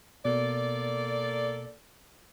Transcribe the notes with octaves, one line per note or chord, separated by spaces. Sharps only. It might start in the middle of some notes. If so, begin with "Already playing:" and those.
B2 A#3 A4 D5